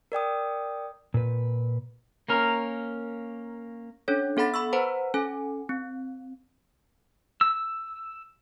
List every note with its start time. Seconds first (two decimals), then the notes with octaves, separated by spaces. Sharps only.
0.12 A#4 D5 G5 D#6
1.14 A#2 B4
2.28 A#3 C#4 A#4
4.08 C#4 D4 A4 C#5
4.37 B3 A4 F#5 B5 A6
4.54 B5 C#6 E6
4.73 B4 C5 F#5 A#5
5.14 C#4 A4 G#5
5.69 C4
7.41 E6